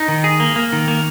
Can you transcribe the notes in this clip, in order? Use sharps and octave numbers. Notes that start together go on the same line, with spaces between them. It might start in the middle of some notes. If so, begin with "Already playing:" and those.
Already playing: D#4
D#3
G#4
A#3
A#3
D#3
A#3